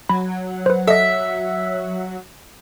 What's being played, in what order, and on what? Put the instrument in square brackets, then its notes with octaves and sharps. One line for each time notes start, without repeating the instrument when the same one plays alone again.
[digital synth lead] F#3 [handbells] B5
[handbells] B4 C5
[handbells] A4 D#5 [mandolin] E5